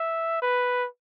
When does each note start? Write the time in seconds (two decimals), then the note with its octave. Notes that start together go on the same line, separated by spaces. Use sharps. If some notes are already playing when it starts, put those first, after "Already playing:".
Already playing: E5
0.42 B4